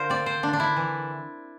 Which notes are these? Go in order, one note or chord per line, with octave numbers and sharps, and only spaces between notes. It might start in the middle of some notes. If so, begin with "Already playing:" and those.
Already playing: D3 F4 A#4 C5
C4 D5
C5
D3 D4
D4
E4
E3